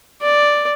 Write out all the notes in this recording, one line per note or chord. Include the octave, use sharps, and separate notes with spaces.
D5